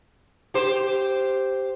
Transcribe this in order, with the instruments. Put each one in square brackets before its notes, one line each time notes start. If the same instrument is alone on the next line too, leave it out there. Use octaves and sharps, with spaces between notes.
[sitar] G4 C5